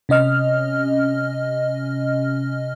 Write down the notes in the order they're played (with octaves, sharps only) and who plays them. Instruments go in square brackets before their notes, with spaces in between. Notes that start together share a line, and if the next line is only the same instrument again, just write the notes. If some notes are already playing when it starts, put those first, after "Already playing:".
[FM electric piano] C3 C#4 D#5 F6